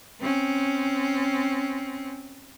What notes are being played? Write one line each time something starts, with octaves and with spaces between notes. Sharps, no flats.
C4 C#4